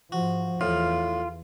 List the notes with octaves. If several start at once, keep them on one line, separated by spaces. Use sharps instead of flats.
G#2 F3 F#4
E2 A2 F4